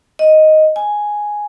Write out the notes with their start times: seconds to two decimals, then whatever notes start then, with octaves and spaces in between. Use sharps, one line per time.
0.19 D#5
0.76 G#5